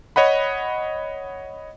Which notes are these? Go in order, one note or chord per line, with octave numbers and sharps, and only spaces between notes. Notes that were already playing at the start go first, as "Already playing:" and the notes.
C#5 D#5 F#5 B5